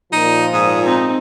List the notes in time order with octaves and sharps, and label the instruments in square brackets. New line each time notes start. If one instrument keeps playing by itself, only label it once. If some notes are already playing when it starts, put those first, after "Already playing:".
[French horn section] A#2 F3 [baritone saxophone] D#4
[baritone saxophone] G#2 [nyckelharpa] D#6
[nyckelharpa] C4 D#4